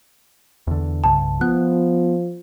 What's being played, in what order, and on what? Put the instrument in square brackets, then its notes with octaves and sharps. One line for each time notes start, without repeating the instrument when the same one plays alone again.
[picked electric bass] E2 D3
[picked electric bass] C2 G2 C#3 [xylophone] A5
[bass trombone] F3 [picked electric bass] B3 [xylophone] F#6